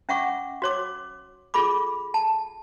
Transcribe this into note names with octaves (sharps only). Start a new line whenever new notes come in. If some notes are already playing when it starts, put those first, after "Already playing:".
C#4 E5 F#5 C#6 D6
F#4 C#5 D6
F4 G#4 A4 B5 D6
A5